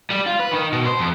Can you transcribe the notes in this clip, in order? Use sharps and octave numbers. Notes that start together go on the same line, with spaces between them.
G3
F4
B4
D#3
B2
C5
F2